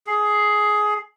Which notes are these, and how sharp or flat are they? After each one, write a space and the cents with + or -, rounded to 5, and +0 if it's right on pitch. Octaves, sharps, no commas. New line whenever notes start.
G#4 +15